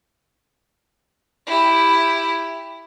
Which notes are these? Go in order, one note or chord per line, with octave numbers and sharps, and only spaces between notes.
E4 G4